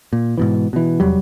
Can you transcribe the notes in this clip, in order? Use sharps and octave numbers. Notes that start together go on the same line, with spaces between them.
A#2
G#2 B2 E3
B2 E3
F1 E2 F#3 G3